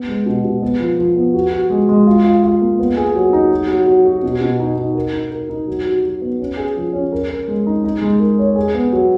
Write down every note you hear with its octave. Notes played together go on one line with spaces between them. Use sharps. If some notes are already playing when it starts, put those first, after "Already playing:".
Already playing: B3
G#3
B2
B2
B3
F3
F3
B3
F#4
F#4
G#3
G#3
F4
F4
F4
A#3
B3
G#4
F#3
D#4
F#3
F#3
F#3
F#4
B2
B2
D#4
D#4
A#4
D#4
A#4
D#4
F#3
F#4
F#3
B3
C#4
G#4
F3
C#4
A#4
A#4
G#3
D#4
D#4
G#3
A#4
C#5
G#4
B3
F#3